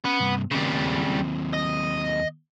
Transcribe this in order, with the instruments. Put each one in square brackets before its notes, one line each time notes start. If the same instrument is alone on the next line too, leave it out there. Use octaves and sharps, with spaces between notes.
[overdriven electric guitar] B3 [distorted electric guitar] C#4
[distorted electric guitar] G2 C3
[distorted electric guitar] D#2 C4 [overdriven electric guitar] C#3 G3
[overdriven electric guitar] D#5